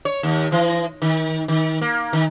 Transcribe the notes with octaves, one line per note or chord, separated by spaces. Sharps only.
C#5
D#2
E3
D#3
D#3
A#3
D#3